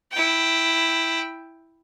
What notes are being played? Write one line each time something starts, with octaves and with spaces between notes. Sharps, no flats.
E4 G5